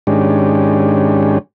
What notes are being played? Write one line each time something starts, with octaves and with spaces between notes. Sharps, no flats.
G#2 D#3 G#3 C#4 D4 G4